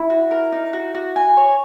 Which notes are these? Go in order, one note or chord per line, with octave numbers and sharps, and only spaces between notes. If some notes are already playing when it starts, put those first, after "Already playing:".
Already playing: E4
F#4
A#4
D#4
F#4
F#4
G#5
C#5